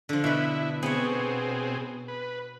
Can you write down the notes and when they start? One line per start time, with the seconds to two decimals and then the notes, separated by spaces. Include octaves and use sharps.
0.09 D3 F3
0.24 B2 E4 B4
0.83 B2 B3 C4 G#4 C#5
2.08 B4